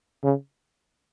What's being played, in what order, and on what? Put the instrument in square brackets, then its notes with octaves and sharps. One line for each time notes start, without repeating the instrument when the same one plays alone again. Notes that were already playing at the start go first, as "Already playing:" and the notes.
[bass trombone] C#3